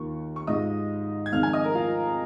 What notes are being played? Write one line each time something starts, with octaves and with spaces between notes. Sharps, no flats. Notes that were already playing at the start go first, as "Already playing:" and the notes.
Already playing: D#2 D#3 A#3 F4 C#6
C#6
G#2 G#3 F4 D#5 D#6
G#6
F2 D#3 G#3 D#4 F5 F6
G#5 G#6
D#5 D#6
A#4 A#5
F4 F5